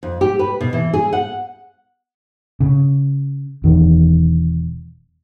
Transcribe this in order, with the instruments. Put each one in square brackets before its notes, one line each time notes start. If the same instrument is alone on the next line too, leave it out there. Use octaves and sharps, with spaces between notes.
[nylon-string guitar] F2
G4
B4
B2
E3
G#4
F#5
[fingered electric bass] C#3
E1 E2 D#3